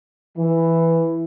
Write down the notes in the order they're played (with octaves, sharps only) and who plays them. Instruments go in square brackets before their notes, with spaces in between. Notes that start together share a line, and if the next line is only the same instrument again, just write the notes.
[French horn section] E3